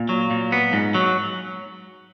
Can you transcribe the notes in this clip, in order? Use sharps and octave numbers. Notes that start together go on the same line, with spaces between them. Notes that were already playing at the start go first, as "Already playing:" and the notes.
Already playing: A#2
F#3
A#2
B3
G#2
F#3